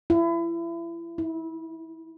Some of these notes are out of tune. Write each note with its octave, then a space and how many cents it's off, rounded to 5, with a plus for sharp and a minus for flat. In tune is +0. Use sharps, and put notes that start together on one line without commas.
E4 +30
E4 -25